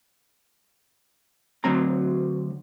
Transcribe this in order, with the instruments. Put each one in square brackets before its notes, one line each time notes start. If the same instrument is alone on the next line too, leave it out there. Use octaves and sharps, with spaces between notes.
[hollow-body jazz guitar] D2 F#3 C4 A#5